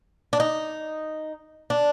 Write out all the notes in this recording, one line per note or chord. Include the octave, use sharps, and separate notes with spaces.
D4
D#4
D4